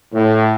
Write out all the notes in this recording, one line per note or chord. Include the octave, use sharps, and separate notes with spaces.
A2